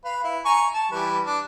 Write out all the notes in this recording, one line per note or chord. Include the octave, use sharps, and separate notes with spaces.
B4 F5
E4
G#5 A#5 C#6
A5
E3 G3 B4
D4